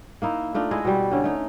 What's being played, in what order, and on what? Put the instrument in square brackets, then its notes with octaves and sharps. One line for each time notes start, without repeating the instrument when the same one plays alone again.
[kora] A#3 D#4 E4
A3 D4 D#4 F4
G#3 E4 D#5
B2 G3
D3 C#4
A3 D#4